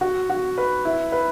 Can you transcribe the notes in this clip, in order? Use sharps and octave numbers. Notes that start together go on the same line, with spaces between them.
F#4
F#4
B4
E4
B4